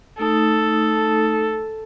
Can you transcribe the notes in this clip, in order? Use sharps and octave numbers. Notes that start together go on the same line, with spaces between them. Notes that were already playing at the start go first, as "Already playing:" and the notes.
A3 D#4 A4 D#6